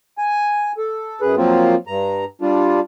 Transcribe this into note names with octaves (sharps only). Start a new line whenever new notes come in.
G#5
A4
F#2 G#4 B4
F3 F#3 A#3 C4 F4
G2 A#5
G3 D4 F4